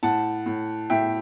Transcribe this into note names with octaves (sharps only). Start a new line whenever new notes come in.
A2 F#5 A5
A2
A2 E5 G5